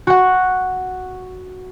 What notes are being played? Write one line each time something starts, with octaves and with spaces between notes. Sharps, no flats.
F#4 F#5